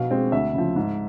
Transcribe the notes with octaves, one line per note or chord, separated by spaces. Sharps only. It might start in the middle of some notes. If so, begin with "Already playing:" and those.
Already playing: B2 F5
G#3 C4
D2 E5
C#3 F3
G#2